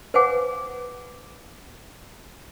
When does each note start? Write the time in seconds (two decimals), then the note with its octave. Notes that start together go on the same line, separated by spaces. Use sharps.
0.14 B4 C5 F5 F#5 G#5 D6